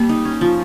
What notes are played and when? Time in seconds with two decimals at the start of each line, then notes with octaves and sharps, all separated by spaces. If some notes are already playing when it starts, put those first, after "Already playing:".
Already playing: G3 A#3
0.09 D#4
0.25 C#4
0.41 F3